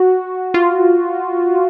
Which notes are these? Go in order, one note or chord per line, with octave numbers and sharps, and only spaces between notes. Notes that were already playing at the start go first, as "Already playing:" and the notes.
Already playing: F#4
F4